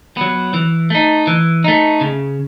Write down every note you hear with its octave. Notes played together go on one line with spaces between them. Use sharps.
F#3 B3
E3
A3 D#4
E3
A3 D#4
C#3